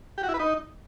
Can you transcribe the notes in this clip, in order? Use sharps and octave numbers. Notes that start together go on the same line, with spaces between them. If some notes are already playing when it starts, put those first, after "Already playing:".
G4
F#4
E4
B4
D#4